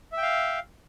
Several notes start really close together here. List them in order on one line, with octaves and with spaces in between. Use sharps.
E5 G5 F5